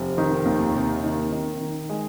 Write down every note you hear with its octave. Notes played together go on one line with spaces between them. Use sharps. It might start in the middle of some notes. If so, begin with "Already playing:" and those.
Already playing: F1
D#3
D#2
C3
D#3
D#3
D#3
G#3